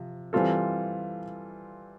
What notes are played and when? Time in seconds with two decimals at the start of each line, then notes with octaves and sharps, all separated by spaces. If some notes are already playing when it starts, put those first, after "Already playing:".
Already playing: C3 F3
0.33 E3 G3 C4 F4 A4